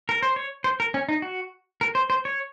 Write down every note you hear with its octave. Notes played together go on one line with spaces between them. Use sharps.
A#4
C5
C#5
C5
A#4
C#4
D#4
F#4
A#4
C5
C5
C#5